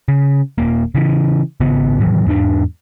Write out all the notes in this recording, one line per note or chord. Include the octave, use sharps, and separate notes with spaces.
C#3
D#1 A#3
C#3 E3
G#1 C#3 B3
A2 D#3 E3 F#3
E2 G#2 C#4 D4